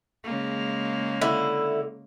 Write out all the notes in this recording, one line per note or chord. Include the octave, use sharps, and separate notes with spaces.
C#3 G#3 A#3
D3 E4